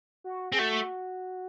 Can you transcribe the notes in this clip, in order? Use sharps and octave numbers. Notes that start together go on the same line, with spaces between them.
F#4
C4 G#4
A3 F#4